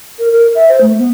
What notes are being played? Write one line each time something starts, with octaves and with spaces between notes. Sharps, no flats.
A#4
A#4
E5
C5
A3
B3